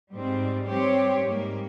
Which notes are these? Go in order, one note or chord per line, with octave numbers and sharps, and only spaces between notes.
G#2 G3 C4
G3 C4 G4 C#5
G#2 G3 A#3